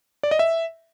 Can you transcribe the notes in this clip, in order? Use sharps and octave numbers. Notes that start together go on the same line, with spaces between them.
D5
D#5
E5